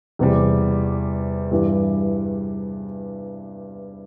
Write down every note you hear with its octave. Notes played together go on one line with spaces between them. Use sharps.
E2 C3 G3
G2 E3 G3